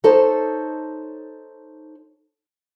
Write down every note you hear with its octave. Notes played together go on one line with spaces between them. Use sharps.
D#4 A4 C5 C#5